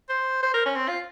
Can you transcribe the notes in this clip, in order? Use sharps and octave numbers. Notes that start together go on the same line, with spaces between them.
C5
C5
A#4
C#4
C4
F4